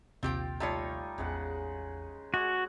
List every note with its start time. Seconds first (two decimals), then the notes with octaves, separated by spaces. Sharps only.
0.23 A#1 D#2 C3 C4 F4 G4 G5
0.60 G3 A3 D#4 F4 C#5
1.18 A1 E2 C#3 G#3 F#5
2.34 G#3 F#4 F#5 C#6 D6 G#6